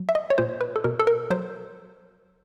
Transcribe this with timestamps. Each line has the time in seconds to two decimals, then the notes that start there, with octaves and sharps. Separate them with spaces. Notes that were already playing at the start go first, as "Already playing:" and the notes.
Already playing: F#3
0.09 E5
0.15 D#5
0.30 C#5
0.38 A#2 C5
0.61 B4
0.76 A4
0.84 B2 A#4
0.99 A4
1.07 A#4
1.30 F#3 C5